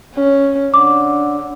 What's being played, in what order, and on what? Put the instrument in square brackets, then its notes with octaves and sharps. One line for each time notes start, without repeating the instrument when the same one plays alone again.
[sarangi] C#4
[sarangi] D3 [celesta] D6